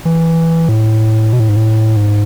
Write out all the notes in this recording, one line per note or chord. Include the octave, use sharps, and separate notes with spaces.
E3
A2
B2
A2
G#2
A2
G#2